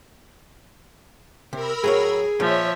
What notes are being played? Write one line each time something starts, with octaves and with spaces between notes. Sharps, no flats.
C3 A#4 B5 E6
A2 F#3 G#4 C#5
A#2 F3 C#5 E5